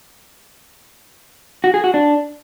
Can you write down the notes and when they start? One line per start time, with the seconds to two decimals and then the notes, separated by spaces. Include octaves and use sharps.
1.64 F#4
1.74 G#4
1.84 F#4
1.94 D4